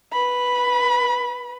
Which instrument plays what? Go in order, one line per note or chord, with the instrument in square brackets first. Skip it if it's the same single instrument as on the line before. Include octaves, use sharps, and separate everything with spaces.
[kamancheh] B4 B5